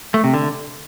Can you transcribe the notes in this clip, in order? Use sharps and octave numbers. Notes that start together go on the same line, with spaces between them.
A3
C3
D3